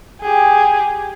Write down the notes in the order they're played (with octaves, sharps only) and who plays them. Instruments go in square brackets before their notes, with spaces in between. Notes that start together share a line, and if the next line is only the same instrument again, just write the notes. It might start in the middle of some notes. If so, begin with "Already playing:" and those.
[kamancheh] G4 G#4